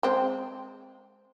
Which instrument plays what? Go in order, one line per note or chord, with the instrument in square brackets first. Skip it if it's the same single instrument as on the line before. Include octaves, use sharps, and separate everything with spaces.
[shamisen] G#3 C4